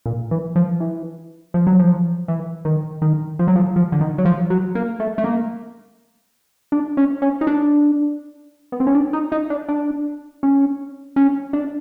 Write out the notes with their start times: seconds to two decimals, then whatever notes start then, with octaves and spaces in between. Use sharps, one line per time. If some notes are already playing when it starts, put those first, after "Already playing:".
0.06 A#2
0.31 E3
0.56 F3
0.80 E3
1.54 F3
1.67 F#3
1.79 F3
2.28 E3
2.65 D#3
3.02 D#3
3.39 F3
3.48 F#3
3.55 F3
3.76 F3
3.92 D3
4.01 D#3
4.18 F#3
4.25 F3
4.50 F#3
4.75 A#3
5.00 A3
5.18 A3
5.24 A#3
6.72 D4
6.97 C#4
7.22 C#4
7.41 D#4
7.47 D4
8.72 B3
8.80 C4
8.87 C#4
8.95 D4
9.13 D#4
9.32 D#4
9.50 D4
9.68 D4
10.43 C#4
11.16 C#4
11.53 D4